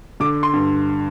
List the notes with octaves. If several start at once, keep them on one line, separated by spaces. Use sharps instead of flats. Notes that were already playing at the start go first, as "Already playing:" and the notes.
D3 D6
C6
G2